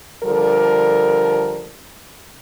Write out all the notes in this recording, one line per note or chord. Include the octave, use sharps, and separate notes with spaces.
D3 F3 G3 A4 A#4